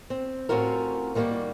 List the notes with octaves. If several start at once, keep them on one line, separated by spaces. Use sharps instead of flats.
C4
A2 C4 C#4 F4 F#4 A#4
D#3 G3 A#3 B3 F#4 G4